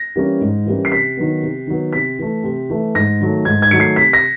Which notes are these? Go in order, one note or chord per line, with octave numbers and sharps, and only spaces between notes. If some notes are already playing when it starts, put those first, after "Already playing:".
Already playing: A#6
E3 G3 A#3 C#4
G#2
E3 G3 A#3 C#4
C7
C3 B6
D#3 F#3 B3
C3
D#3 F#3 B3
C3 B6
E3 A3
C3
E3 A3
G#2 A#6
D#3 F#3 A3
G#2 G#6
G#6
D#3 F#3 A3 C#7
C7
C3 B6
A#6